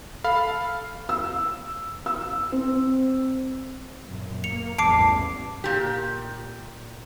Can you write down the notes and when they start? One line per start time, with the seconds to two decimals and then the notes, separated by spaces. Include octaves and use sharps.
0.24 A4 F5 B5 C7
1.09 E6
2.06 E6
2.52 C4
4.08 F#2 A#2
4.44 A#3 C#7 F7
4.78 A1 E2 G2 A5 D6 C7 D7
5.64 A#2 G4